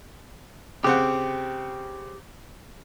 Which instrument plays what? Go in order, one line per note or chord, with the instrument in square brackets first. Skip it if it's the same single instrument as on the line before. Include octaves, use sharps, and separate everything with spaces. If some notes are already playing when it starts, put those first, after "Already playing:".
[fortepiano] C#3 C4 F#5 [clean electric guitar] G4